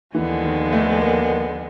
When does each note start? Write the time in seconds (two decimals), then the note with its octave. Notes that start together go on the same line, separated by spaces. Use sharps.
0.15 D#2 D3 E3 F3 G#3 B3
0.44 D#3
0.73 A3
1.02 A#3